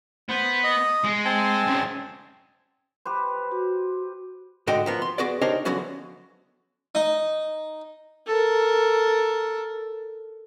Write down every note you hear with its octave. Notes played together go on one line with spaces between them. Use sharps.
B3 C5
D#5
G#3
C4 G#5 A5
F#2 C#3
G4 B4 C5
F#4
G#2 D3 F#4 D#5 G5
F3 A#3 B3
C6
B3 F#4 G#4 B4 D5
D4 D#4 G4 A#4 C5 C#5
D3 F3 F#3 B3 C#4 F#4
D#4
A4 A#4